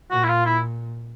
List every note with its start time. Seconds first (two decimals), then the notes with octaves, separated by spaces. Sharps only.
0.10 A#2 F#4
0.23 E4
0.28 F4
0.46 E4